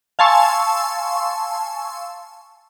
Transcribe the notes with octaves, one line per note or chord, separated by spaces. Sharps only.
F5 G#5 A5 C6 C#6 E6